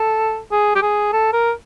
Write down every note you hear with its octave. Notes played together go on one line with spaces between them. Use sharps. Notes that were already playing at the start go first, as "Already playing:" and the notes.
Already playing: A4
G#4
G4
G#4
A4
A#4